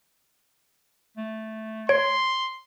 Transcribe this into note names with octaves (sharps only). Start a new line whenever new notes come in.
A3
C#5 C6